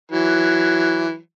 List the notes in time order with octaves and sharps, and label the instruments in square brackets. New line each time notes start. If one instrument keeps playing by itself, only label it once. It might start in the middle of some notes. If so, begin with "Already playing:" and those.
[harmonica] E3 F#3